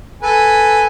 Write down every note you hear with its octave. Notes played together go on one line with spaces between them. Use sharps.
A4 B4 G#5